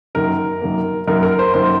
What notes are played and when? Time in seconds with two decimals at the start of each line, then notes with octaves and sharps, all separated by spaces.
0.15 F#2 D#3 A#3 A#4
0.61 F#2 D#3 A#3
1.07 F#2 D#3 A#3 A#4
1.23 A#4
1.39 C5
1.54 F#2 D#3 A#3 C5